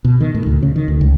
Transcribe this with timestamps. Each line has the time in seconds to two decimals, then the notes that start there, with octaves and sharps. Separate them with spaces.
0.05 B2
0.20 D#3
0.35 A2
0.46 D2
0.63 C#3
0.76 D#3
0.88 D2
1.01 C#2